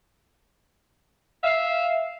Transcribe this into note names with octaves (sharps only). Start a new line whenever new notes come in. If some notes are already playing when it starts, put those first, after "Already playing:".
E5 F5